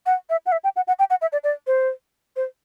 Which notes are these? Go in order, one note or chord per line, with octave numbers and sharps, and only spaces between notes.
F#5
E5
F#5
E5
G5
F#5
F#5
G5
F#5
E5
D5
D5
C5
C5